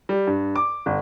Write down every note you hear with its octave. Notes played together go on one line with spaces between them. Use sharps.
G3
G2
D6
G1